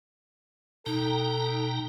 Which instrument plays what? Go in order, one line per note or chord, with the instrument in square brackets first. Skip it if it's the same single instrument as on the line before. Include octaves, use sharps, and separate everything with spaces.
[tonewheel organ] B2 G5 A#5 [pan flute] D#4 [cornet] A4